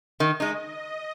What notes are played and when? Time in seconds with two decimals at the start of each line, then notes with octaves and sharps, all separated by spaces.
0.20 D#3 D#5
0.40 G#3 D#4